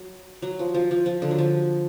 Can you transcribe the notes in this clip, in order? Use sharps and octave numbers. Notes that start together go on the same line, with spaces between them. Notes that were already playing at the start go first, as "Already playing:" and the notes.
Already playing: F#3
F#3
F3
F3
F3
F3
D3
F#3
F3